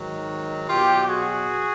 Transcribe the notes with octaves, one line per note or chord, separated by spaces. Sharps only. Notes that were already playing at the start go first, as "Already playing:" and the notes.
Already playing: G#2 D#3 F#3
B2 F#3 F4 G4
F#4 G#4